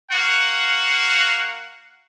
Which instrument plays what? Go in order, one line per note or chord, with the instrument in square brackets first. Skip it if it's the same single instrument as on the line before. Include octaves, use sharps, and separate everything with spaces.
[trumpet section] A#3 F#4 F5 F#5